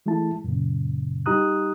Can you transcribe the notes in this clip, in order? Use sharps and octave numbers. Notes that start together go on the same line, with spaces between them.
E3 G#3 A3 E4 A5
F#2 A#2 C#3
G3 D#4 G4 A#5 D#6 F#6